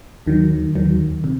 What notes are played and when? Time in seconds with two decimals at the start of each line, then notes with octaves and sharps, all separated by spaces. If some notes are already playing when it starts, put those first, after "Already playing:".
0.27 D#2 D#3 F#3
0.75 D#2 D#3 F#3
1.24 C3